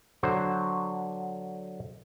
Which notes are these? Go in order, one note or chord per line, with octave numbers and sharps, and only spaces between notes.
D3 F#3 C5